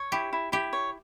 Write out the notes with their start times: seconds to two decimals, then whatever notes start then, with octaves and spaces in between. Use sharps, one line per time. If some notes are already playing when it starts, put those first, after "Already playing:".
Already playing: C#5
0.12 E4 G4
0.33 E4
0.52 E4 G4
0.73 C#5